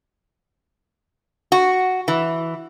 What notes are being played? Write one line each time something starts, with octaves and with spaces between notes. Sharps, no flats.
F#4
E3